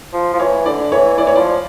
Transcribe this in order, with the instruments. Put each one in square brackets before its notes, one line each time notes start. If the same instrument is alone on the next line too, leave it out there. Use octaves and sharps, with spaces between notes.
[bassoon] F3
F3
[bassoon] E3 [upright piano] C#5
[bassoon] D3 [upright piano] D5
[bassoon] E3 [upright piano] C#5
[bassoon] E3 [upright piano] D5
[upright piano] C#5
[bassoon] F3 [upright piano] D5